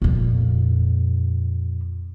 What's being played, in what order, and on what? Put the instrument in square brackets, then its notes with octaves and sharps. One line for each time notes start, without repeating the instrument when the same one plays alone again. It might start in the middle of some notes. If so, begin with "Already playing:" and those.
[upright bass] F2 A#2